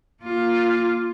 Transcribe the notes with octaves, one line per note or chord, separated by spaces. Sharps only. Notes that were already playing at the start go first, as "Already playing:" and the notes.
A#3 F4